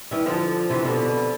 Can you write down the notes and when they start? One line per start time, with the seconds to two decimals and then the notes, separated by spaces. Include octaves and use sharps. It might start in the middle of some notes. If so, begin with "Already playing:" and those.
0.11 E3 G3
0.26 D3 F3
0.70 C3 E3
0.85 B2 D3